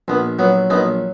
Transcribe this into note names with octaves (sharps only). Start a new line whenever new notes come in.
A#1 B3
F#3 B3
A#1 B3 D#4